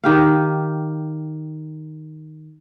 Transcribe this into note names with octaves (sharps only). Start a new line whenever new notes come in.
D#3 G4 F5